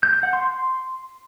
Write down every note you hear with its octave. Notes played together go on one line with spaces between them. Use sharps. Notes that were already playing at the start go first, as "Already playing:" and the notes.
G6
G6
F#5
C6
C6